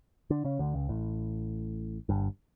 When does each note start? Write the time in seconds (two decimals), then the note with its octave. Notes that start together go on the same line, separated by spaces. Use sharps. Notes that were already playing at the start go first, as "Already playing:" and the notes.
0.30 D3 D4
0.44 C#3 C#4
0.59 D2 D3
0.74 C#2 C#3
0.89 A1 A2
2.09 G1 G2